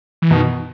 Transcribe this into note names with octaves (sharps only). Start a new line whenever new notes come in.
E3
B2 D#3